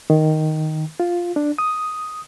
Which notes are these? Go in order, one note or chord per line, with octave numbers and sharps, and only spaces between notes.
D#3
F4
D4
D#6